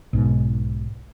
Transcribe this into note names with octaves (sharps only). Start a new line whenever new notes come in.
B1 G#2 B2